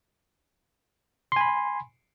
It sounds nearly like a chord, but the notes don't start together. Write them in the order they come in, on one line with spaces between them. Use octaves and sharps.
C6 G#5 B5